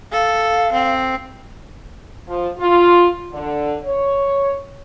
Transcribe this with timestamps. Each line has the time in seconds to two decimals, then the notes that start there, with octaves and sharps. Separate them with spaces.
0.12 A4 F5
0.73 C4
2.28 F3
2.58 F4
3.33 D3
3.84 C#5